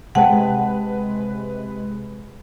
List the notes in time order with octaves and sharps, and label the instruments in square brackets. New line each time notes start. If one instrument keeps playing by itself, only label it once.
[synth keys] C3 G#3 B4 [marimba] F#5 G5 A5